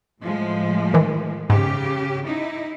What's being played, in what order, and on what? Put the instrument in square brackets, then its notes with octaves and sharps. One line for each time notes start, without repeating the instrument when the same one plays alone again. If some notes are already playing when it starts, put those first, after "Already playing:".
[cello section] A2 F3 G#3
[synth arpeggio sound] D#3 E3
[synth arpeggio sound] G#2 [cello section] C#3 G4
[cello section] D#4 E4